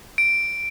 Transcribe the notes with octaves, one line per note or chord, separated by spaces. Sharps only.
D7